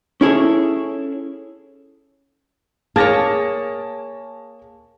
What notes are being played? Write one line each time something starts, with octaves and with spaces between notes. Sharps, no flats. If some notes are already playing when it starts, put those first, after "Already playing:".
C#4 E4 G#4 A4 C#5
A#3 G#4 C#5 A5 A6 A#6